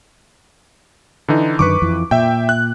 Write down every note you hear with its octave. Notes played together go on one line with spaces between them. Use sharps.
D3 E3 D#4
F#2 D3 D#3 B4 C#6 D6
F2 E3
A#2 E5 G5
F#6